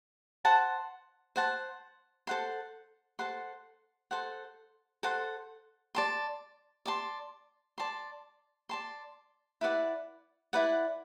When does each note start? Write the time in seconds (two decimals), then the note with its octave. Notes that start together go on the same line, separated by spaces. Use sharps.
0.45 C5 F#5 A5
1.36 C5 F#5 A5
2.27 A4 C5 F#5 C6
3.19 A4 C5 F#5 C6
4.11 A4 C5 F#5 C6
5.03 A4 C5 F#5 C6
5.95 D5 A5 C6
6.86 D5 A5 C6
7.78 D5 A5 C6
8.69 D5 A5 C6
9.61 E4 B4 D5 F#5
10.53 E4 B4 D5 F#5